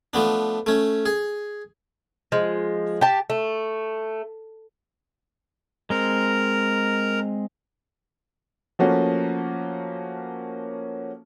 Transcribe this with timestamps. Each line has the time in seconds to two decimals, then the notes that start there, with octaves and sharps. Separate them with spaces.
0.13 F3 A3 B3 D4
0.66 A3 C#4
1.06 G#4
2.32 F3 G#3
3.01 G4 A5
3.30 A3
5.90 G#3 C4 A#4 A#5
8.79 F3 A3 A#3 C#4 F#4